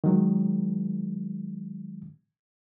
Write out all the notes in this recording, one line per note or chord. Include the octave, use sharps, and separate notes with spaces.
D#3 F#3 G#3